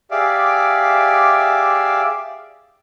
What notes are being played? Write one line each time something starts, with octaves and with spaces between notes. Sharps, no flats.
G4 G#4 D5 E5 F5 D6